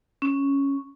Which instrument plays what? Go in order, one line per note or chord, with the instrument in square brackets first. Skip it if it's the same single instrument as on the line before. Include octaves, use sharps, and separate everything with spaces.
[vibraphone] C#4